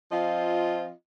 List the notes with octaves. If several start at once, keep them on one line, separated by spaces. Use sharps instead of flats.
F3 C4 F4 D#5